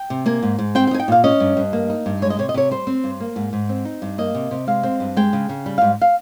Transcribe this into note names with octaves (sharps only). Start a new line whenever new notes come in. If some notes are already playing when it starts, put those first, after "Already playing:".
Already playing: G5
C3
A#3 G#5
G#2
G#2
C4 G5
G5
D#4 G#5
G5
A#2 F5
C#4 D#5
G2
G2
A#3
D#4
G2
G#3 C#5
D#5
C3 C#5
D#5
C3 C#5
G3 C5
C4
G2
A#3
G#2
G#2
C4
D#4
G2
A#3 D#5
C3
C3
G#3 F5
C4
G2
G#3 G5
C#3
C#3
G3
G#2 F5
F5